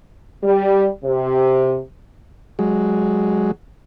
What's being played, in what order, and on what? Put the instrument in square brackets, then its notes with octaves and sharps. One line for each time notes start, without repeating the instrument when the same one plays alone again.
[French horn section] G3
C3
[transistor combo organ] F#3 G#3